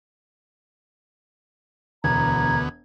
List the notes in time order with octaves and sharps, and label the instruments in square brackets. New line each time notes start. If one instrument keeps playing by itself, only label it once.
[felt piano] E1 [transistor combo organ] D2 B3 [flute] A#5 [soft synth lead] G#6